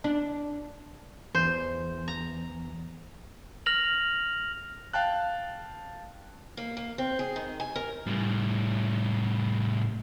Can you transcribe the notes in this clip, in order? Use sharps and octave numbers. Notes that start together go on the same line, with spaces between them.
D4
E2 C5
A#5
F6 A#6 F7 F#7
F5 G5 A5 F#6
A#3
A#3
C4
G#4
D#3
G#5
A#4
A2 G3